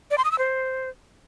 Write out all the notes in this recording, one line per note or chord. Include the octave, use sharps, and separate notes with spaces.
D5
C6
D#6
E6
C5